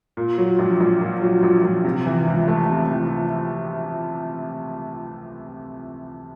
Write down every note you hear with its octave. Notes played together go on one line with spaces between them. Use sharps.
A#2
F#3
A#1
A#1
A#2
F#3
A#1
A#1
C3
E3
C#2
A3
C3
E3